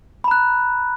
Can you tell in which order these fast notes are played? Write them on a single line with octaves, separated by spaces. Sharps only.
B5 A#5 F#6